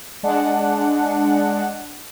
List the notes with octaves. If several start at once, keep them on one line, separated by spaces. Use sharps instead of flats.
G#3 D4 F#5